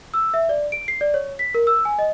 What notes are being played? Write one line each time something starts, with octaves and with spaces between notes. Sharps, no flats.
E6
E5
D5
D7
C7
D5
C#5
B6
A#4
E6
G#5
D#5